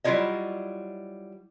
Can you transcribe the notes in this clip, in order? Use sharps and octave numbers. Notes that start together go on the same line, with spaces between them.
F#3 G3 E4 F4 C#5 D#5